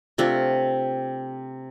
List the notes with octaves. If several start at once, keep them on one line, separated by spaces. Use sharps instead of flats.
C3 A3 D4 F4